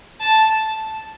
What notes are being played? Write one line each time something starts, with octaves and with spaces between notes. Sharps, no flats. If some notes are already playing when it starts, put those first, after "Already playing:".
A5